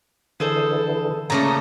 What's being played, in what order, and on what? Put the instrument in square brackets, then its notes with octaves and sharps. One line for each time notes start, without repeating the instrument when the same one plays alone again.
[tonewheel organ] D3 E3 [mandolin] G#4 A4 C5
[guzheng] A#2 C#3 A3 [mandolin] A#5 [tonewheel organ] D#6